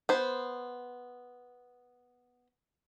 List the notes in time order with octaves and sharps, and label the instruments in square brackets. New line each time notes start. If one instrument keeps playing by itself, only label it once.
[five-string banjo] B3 C5